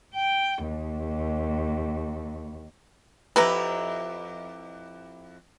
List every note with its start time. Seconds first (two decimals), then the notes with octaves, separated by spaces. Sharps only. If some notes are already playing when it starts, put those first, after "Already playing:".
0.14 G5
0.68 D#2
3.36 F2 E4 G4 B4 E5 A#5